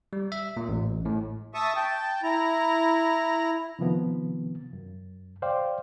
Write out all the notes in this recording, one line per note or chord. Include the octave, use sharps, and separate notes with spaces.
G3
E5
A#2
A1
A2
E5 A5 C#6 D#6
G5 A5
E4 A#5
C3 D#3 F3 B3
F#2
C5 D5 F5 G5